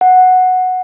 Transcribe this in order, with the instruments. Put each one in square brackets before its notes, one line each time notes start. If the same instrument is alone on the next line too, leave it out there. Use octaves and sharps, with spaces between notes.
[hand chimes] F#5